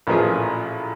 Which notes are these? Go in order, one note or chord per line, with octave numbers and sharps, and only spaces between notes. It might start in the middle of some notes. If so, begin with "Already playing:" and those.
A1 A#2 F3 G#4